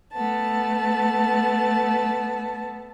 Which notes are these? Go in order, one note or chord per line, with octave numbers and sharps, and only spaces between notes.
A3 B3 A5